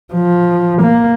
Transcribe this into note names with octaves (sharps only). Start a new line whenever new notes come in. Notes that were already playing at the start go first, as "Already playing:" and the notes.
F3
A#3